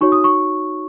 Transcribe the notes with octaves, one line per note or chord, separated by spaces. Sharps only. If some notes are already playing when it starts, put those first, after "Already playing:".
D#4 F#4 C#5 C#6
D#6
C#6